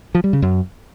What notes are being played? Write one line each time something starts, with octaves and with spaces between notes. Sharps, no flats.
F3
G3
C#3
F#2